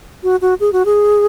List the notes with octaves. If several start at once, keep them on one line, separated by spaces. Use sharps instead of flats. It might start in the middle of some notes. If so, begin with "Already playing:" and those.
F#4
F#4
G#4
F#4
G#4